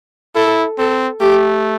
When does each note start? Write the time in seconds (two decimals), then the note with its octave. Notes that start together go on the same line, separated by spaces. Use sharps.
0.35 E4 A4
0.78 C4 A4
1.20 A3 G4